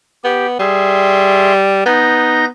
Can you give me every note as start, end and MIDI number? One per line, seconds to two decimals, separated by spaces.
0.24 0.57 59
0.24 0.46 67
0.59 1.81 55
0.59 1.53 68
0.59 1.53 76
0.59 1.53 84
1.86 2.48 59
1.86 2.45 63
1.86 2.45 91
1.86 2.45 94